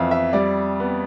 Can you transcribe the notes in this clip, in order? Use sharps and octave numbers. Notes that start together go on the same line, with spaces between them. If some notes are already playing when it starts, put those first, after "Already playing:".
Already playing: F2 E3 E5 F5
E5
G3 D5
B3